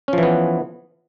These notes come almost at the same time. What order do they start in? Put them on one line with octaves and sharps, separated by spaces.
C#4 F3 E3 B3